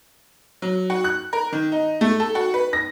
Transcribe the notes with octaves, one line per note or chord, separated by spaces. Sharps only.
F#3
F#4
F#6
A#4
D#3
D#4
A3
A4
F#4
B4
A#6